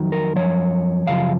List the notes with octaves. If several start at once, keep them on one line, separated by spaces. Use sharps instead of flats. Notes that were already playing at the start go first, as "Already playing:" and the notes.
Already playing: F2 D#3 F#3
A#4
F#2 C#3 F3 C#5
F#2 C#3 F3 F5